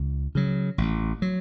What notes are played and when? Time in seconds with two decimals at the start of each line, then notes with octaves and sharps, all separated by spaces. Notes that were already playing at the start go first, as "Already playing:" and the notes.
Already playing: C#2
0.35 C#3 F#3
0.78 A1
1.22 F#3